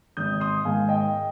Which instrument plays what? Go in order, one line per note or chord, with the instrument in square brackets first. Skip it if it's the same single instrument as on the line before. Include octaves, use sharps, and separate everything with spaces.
[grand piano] G#1 D#6 G6
C6 D#6
G#2 D#3 F5 G#5
D#5 G5